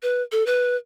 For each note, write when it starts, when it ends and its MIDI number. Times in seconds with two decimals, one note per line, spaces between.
0.03 0.22 71
0.32 0.45 69
0.46 0.76 71